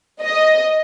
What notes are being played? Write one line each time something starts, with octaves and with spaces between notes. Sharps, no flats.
D#5